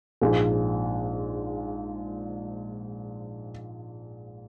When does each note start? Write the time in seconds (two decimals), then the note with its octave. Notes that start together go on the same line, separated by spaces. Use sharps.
0.22 A#1 G#2 F3 G#3